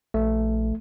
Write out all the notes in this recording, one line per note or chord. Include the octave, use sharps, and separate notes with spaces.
A#1 A3